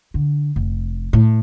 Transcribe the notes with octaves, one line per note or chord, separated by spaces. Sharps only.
D3
F1
A2